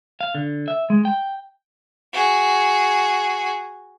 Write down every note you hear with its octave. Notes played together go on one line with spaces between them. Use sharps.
F5
D3
E5
G#3
G5
F#4 G#4